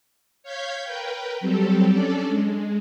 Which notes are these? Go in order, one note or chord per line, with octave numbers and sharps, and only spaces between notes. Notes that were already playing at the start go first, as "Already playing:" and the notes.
C#5 F5 G6 G#6 B6
A#4 B4 G5
F#3 G3 C4 G4 A4
C#4 D4 A4 D5
G#3